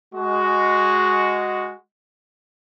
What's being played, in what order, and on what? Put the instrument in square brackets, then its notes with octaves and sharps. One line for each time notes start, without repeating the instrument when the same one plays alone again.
[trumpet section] G#3 F#4